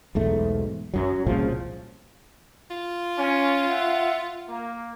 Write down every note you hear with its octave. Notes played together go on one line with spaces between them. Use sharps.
B1 E2 G#2 A3
F#2 F#3
C2 A#2 C#3 F3
F4
C#4
E5 F#5
A#3